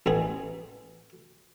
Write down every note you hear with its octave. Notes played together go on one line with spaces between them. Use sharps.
A1 B3 G#4